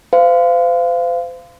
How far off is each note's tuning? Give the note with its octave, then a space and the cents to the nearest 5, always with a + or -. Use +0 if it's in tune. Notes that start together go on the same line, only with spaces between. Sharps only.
C5 -35 F5 -15